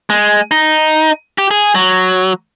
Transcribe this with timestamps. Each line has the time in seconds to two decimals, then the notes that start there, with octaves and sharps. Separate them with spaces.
0.10 G#3
0.51 D#4
1.38 G4
1.51 G#4
1.75 F#3